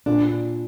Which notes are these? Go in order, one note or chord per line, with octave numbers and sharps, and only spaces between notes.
A#2 D4